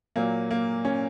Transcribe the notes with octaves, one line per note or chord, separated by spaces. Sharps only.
A#2 F#3 A#3
A#3
C#4